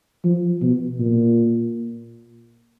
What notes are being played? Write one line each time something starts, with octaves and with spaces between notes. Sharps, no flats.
F3
B2
A#2